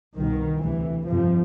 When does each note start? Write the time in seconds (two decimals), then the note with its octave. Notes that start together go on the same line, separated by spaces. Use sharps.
0.16 C2 B2 D#3
0.62 D2 C3 E3
1.08 G1 F2 C3 F3